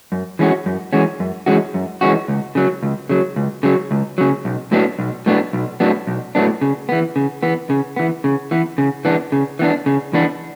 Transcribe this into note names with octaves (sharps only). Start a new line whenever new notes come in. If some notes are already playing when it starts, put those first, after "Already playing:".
F#2
E3 G#3 C#4 F#4
F#2
E3 G#3 C#4 F#4
F#2
E3 G#3 C#4 F#4
F#2
E3 G#3 C#4 F#4
C#2
C#3 F#3
C#2
C#3 F#3
C#2
C#3 F#3
C#2
C#3 F#3
B1
A2 F#3 B3 D4
B1
A2 F#3 B3 D4
B1
A2 F#3 B3 D4
B1
A2 F#3 B3 D4
C#3
E3 B3
C#3
E3 B3
C#3
E3 B3
C#3
E3 B3
C#3
E3 B3 D4
C#3
E3 B3 D4
C#3
E3 B3 D4